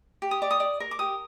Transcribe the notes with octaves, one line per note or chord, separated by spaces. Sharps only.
G4
D#6
D5 D6
D#6
D5
A#4
D6
G4 D#6